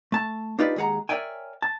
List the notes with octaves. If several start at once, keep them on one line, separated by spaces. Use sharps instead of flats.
A3 A5
D4 D#4 F4 G4 B4 D5
D#2 G#3 G#4 F#5 A#5
A#4 C#5 D5 E5 G5 G#5
A5